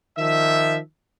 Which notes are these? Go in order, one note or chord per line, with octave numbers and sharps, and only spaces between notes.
D#3 F3 E5